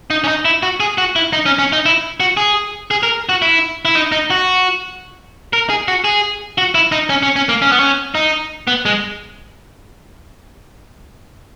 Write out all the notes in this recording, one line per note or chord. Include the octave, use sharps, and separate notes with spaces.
D#4
C#4
D#4
E4
F#4
G#4
F#4
E4
D#4
C#4
C#4
D#4
E4
F#4
G#4
G#4
A#4
F#4
E4
E4
D#4
D#4
F#4
A#4
G#4
F#4
G#4
F#4
E4
D#4
C#4
C#4
C#4
A#3
C#4
B3
C#4
D#4
B3
G#3